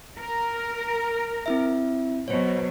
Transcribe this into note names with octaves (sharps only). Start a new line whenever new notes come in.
A#4
C4 E4 E5
B2 F#3 C5 C#5